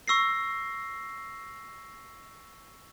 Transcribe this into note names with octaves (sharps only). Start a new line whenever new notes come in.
C#6 E6 A#6 C7